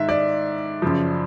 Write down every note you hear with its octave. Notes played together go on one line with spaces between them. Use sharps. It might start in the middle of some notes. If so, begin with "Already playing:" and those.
Already playing: G#2 D#3 E5
D5
F#2 C#3 F3